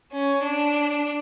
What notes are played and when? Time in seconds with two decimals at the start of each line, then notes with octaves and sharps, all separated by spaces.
0.11 C#4
0.42 D4